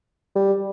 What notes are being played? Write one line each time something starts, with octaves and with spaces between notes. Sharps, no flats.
G3